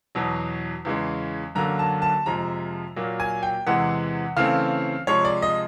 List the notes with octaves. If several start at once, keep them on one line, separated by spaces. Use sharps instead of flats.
E2 B2 F#3
E2 C#3 E3 G#3
F#2 D3 F#3 A#3 A#5
A5
A5
F2 C3 F3 G#3 A#5
A#2 F#3 A#3
G#5
G5
E2 C3 E3 G#3 F#5
C#3 E3 A3 C4 F5
C3 F3 G#3 C#5
D5
D#5